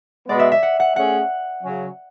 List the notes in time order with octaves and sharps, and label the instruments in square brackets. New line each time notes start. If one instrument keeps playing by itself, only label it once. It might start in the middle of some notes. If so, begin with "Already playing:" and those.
[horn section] B2 G#3 B3 [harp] D5
[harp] E5
E5
F#5
F#5
[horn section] A3 C#4 G#4 [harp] F#5
[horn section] C#3 F#3 C#4